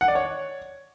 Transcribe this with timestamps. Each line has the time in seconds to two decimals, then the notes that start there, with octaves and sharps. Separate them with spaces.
0.01 F#5
0.08 D5
0.15 C#5